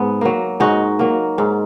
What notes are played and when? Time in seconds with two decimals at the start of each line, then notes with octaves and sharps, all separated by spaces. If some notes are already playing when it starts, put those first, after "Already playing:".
Already playing: G#2 B3
0.21 F#3 A#3
0.60 G#2 D#4 F#4
0.99 F#3 A#3
1.38 G#2